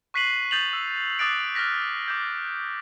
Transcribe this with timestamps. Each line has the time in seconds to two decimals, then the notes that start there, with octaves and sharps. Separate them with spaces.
0.14 C#6 F#6 B6 C7 D#7 F#7
0.51 D#6 G6 A6 D#7 F7 F#7
0.73 E6
1.19 D6 D#6 F#6 A6 D7 F7
1.55 F6 F#6 A#6 B6
2.08 D6 G6